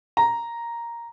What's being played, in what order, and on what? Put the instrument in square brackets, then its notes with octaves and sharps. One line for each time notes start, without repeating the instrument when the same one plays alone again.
[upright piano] A#5